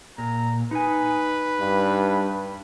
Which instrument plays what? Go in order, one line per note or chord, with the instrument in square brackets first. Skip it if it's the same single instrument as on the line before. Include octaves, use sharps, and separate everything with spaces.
[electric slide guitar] A#2 [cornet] A#5
[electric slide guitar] D#4 G#5 [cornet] B4
[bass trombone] G2